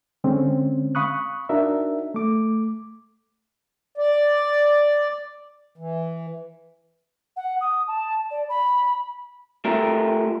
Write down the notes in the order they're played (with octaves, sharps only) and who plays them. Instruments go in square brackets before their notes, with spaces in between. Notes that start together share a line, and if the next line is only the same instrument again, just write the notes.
[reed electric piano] D3 G#3 C4 C#4
F5 B5 C#6 D#6 F#6
D4 D#4 F#4 A#4 E5
A3 D6
[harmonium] D5
E3
[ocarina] F#5
D#6
A5
D5
B5
[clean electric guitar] A3 F4 G4 A#4 E5